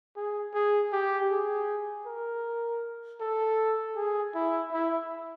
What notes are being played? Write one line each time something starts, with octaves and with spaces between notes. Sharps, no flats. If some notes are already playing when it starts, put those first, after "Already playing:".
G#4
G#4
G4
G#4
A#4
A4
G#4
E4
E4